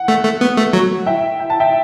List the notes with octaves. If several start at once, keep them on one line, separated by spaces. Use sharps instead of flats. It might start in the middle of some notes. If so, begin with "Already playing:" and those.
Already playing: F#5
A3
A3
B3
A3
F#3
E5 G5
G5
A5
E5 G5